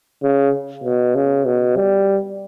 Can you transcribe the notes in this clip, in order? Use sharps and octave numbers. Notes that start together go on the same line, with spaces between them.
C#3
B2
C#3
B2
G3